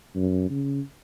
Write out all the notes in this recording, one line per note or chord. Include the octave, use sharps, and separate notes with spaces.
F#2
C#3